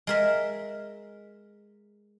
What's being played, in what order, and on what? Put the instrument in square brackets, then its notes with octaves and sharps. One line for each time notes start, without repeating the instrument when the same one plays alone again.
[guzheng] G#3 A#4 E5